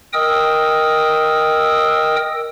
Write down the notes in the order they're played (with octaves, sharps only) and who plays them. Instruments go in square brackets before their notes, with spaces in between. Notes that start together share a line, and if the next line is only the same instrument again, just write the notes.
[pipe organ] A#4 D#5 G5 D#6 E6